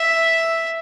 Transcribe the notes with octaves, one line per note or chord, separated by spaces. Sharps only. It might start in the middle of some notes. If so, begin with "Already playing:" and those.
Already playing: E5